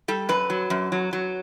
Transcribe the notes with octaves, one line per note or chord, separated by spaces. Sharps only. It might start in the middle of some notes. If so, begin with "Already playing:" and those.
G3 A4
F#2 B4
F#3
F#2
F#3
F#3